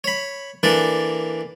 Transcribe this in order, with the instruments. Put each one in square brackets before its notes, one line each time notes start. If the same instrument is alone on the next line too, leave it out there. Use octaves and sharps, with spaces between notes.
[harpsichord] C#5 B5
E3 A#3 D4 A4 D5